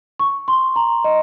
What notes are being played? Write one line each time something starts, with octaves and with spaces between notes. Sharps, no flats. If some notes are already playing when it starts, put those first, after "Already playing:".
C#6
C6
A#5
D#5